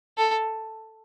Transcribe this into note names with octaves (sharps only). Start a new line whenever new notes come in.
A4